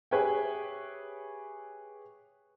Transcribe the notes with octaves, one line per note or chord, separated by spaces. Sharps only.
G4 G#4 B4 C#5 E5 G5